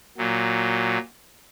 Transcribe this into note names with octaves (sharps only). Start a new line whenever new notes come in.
A#2 F#3